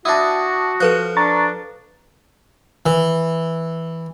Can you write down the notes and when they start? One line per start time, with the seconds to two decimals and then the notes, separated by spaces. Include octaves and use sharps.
0.05 D4 E4 F#4 A5 D#6
0.80 F3 A4 B4 F#6
1.17 D4 A#5 C#6 A6
2.86 E3